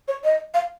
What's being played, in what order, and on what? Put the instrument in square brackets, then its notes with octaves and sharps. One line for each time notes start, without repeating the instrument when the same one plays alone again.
[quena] C#5
D#5
F5